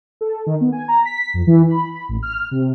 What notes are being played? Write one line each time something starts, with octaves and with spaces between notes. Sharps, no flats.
A4
D#3
B3
G#5
A#5
B6
F2
E3
B5
A1
F6
C3